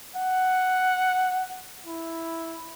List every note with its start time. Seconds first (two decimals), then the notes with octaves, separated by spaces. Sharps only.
0.16 F#5
1.86 E4